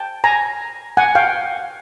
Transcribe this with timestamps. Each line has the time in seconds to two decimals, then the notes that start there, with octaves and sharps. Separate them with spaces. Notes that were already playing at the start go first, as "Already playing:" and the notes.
Already playing: G5 A5
0.24 G#5 A#5
0.97 F#5 G#5
1.15 F5 G5